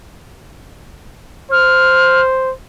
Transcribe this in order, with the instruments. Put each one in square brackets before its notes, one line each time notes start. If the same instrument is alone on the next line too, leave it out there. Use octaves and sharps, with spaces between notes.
[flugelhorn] C5 [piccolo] F6